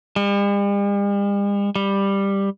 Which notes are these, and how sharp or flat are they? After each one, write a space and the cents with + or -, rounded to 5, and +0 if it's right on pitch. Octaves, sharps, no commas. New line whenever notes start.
G3 +45
G3 +10